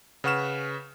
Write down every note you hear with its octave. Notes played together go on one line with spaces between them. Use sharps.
C#3 B4 F#5 C#6 F6 E7